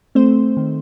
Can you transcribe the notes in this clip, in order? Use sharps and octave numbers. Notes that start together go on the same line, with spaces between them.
A3 C4 C5
D#3